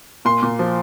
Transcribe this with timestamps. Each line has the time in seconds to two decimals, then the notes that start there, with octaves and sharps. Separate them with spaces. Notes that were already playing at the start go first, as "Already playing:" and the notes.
0.25 A#2 C6
0.42 A#2
0.59 F3